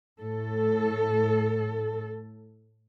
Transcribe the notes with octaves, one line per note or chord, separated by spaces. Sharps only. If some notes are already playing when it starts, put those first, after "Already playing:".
A2 A4